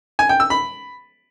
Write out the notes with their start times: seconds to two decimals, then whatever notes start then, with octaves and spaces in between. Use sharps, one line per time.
0.19 G#5
0.29 G5
0.40 E6
0.50 B5